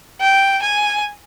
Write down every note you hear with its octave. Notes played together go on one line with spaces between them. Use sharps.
G5
G#5